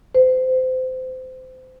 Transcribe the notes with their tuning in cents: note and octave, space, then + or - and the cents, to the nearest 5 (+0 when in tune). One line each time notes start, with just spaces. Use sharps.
C5 -25